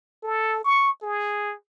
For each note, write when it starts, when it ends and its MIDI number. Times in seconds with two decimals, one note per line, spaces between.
0.23 0.60 69
0.64 0.91 85
1.02 1.54 68